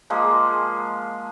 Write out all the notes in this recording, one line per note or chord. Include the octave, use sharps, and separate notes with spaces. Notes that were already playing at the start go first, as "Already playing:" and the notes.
F3 G#3 A#3